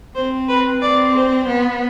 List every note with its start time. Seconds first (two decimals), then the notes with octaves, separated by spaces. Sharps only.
0.15 C4 C5
0.48 B4
0.82 C4 D5
1.14 C5
1.47 B3